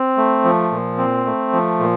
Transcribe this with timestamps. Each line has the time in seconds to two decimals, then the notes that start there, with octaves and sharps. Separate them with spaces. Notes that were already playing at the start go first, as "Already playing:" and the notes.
Already playing: C4
0.17 A3
0.44 F3
0.72 A#2
0.98 C4
1.26 A3
1.53 F3
1.80 A#2